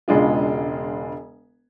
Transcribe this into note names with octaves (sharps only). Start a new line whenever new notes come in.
E1 C#3 G#3 D4 F4